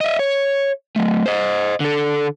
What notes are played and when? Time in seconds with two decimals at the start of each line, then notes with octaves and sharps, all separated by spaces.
0.01 D#5 E5
0.19 C#5
0.96 F#3 A3
1.26 C5 D#5
1.80 D3 A4